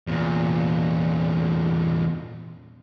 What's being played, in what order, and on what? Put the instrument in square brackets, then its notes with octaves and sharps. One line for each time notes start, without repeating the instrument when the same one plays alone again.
[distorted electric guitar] E2 A#2